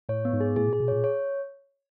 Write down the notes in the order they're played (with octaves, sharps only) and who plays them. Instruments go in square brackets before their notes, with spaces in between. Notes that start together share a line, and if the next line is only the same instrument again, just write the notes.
[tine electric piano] A2 [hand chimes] C#5
[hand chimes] B3
[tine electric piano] G#2
[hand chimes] G#4
[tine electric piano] A2 [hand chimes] G#4
[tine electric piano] A#2 [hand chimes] G#4
[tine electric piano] B2
[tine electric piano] A#2 [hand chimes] C#5
[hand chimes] C#5